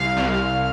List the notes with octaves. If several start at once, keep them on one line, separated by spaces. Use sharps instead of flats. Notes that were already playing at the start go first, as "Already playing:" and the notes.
Already playing: C2 F5
C2